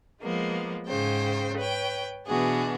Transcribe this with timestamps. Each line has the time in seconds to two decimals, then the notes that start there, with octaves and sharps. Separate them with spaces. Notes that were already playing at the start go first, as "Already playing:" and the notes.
0.22 F3 G#3 A#3 B3
0.86 G#2 C#3 C5 G5
1.57 B4 C#5 G5
2.25 B2 E3 B3 D4 F#4 G#4